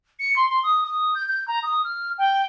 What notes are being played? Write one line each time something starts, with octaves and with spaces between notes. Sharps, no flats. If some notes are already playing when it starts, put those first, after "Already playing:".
C#7
C6
C6
D#6
D#6
G6
G6
A#5
D#6
F6
G5